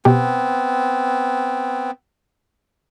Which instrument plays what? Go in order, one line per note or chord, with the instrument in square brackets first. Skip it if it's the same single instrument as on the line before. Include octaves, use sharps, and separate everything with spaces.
[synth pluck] B2 G4 [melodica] B3 C4